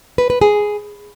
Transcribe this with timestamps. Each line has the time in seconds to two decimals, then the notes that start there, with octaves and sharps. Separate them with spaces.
0.18 B4
0.30 B4
0.41 G#4